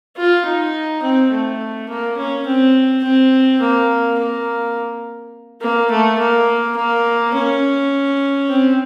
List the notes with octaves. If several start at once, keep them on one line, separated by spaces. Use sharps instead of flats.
F4
D#4
C4
A3
A#3
C#4
C4
C4
A#3
A#3
A#3
A3
A#3
A#3
C#4
C4